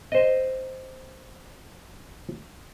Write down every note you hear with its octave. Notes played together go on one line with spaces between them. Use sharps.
C5 D#5